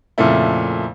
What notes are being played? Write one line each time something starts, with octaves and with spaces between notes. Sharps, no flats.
F2 A#2 C#3 A3 E4